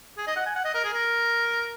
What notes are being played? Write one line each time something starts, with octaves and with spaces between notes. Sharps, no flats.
G#4
D#5
F#5
G#5
F#5
D#5
A#4
G#4
A#4